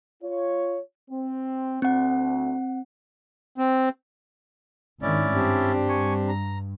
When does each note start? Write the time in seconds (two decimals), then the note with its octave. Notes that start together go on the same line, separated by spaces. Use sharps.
0.23 F4 C#5
1.11 C4
1.82 D2 C4 F#5
3.58 C4
5.02 G#1 D#3 C#4 E4 D5
5.34 G2 C4 D4 G4
5.89 G#5 C#6
6.28 A#5